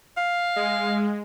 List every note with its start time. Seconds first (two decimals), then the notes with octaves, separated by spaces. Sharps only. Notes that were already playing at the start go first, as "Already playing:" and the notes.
0.17 F5
0.56 G#3